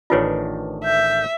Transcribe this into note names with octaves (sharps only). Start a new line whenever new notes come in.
A1 D#3 D4 F4 B4 C#5
E5 G6